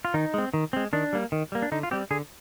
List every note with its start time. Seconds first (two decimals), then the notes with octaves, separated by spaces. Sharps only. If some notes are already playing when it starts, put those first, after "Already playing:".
0.05 F4
0.14 D#3 D#4
0.34 G#3 C4
0.54 D#3
0.73 G#3 C4
0.93 D#3 D4
1.13 G3 A#3
1.32 D#3
1.52 G3 A#3
1.62 D4
1.72 D3 D#4
1.83 F4
1.91 G3 C4 G4
2.11 D3 G#4